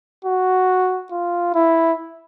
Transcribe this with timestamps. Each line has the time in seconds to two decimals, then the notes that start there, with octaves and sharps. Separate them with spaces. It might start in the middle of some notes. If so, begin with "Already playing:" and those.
0.25 F#4
1.12 F4
1.55 E4